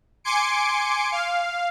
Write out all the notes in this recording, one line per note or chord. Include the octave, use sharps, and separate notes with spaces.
G#5 C6 D6 C#7 D7
F5